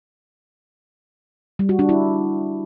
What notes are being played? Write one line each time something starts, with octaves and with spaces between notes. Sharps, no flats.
G3
F#4
D4
E4